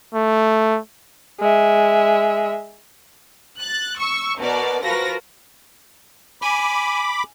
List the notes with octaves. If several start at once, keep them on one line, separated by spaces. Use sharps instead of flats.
A3
G#3 E5
F#6 A6
C#6 E6
B2 A#4 D5
F3 F4 F#4 A#4 B4 A#6
G#5 B5 D6